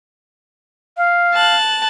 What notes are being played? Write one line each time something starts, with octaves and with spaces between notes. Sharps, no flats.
F5
A5 F#6